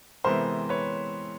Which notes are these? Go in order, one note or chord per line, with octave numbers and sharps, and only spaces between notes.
C3 E3 G#3 B3 A#4 C5
B4 C#5